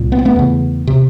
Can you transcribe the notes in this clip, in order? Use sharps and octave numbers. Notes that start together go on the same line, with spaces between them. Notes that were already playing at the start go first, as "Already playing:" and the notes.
Already playing: C2 A#2
B3
C4
A3 B3
E2 C#3
C3